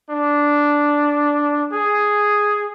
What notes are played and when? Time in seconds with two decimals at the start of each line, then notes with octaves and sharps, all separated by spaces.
0.11 D4
1.73 G#4